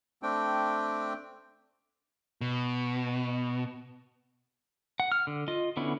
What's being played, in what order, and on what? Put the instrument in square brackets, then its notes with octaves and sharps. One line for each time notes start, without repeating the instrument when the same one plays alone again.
[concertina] A3 C4 D4 G5
[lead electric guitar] B2
[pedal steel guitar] F#5
F6
D3
F4 D#5
D3 B3 C#4 E4